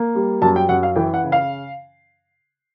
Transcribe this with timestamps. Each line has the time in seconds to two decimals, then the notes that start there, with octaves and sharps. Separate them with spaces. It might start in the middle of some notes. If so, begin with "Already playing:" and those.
Already playing: A#3
0.15 G3
0.42 F#2 A5
0.56 G5
0.69 F#2 F#5
0.83 F5
0.96 E3 G5
1.14 F#5
1.24 C#3
1.32 F5